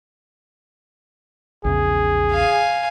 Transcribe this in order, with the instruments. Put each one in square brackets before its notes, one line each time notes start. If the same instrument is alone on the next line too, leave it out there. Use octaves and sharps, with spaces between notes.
[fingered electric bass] A#1 E2 C#3 [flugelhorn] G#4
[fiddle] F5 G#5